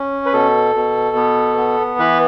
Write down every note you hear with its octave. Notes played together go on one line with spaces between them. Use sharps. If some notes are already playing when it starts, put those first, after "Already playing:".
Already playing: C#4
B4
B2 A4
B2
B3
B3
E3 B4